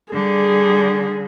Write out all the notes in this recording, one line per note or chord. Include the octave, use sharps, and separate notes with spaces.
D3 G3 G#4